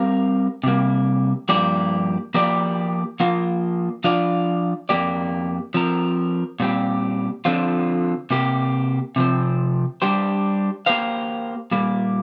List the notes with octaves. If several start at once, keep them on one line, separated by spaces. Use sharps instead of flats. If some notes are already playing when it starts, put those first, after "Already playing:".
Already playing: G3 C4 G4 A#4 F5
C3 G3 A#3
G2 F3 A#3 G4 D5
F3 A#3 G4 D5
F3 A#3 F4
F3 D4 F4 D5 F5
F2 C3 A#3 G4 D5
F3 C4 A#4
A#2 G3 C4 G4
D3 F3 C4 F4
C3 A#3 G4
C3 F3 C4
G3 D4 G4 C5
A#3 G4 C5 F5
A#2 G3 A#3